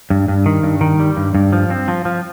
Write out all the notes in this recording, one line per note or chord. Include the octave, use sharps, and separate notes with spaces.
G2
G2
D#3
G2
D#3
G3
G2
G2
F3
C4
F3
F3